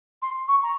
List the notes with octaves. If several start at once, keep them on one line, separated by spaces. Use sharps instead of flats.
C6
C#6
A#5